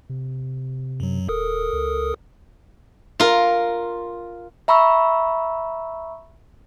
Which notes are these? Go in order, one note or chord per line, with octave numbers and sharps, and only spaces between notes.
C3
F#2 F#3
D#1 A4 A#4 D#6
C#2
F4 A#4
E5 A#5 B5 C#6 E6